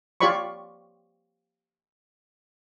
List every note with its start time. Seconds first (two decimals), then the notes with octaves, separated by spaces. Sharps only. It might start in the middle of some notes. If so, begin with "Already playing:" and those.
0.21 F4 G4 C#5 D5 B5 C#6